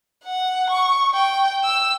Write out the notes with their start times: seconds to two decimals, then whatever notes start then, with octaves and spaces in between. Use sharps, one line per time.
0.24 F#5
0.70 C#6
1.14 G5
1.64 E6